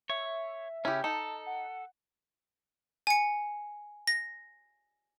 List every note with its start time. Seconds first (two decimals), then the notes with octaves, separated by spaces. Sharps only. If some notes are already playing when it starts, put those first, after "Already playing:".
0.10 C#5 E5
0.85 C#3 C#4 E4 G4
1.04 D#4 A4 A5
1.46 F#5
3.07 G#5 C#7
4.07 A#6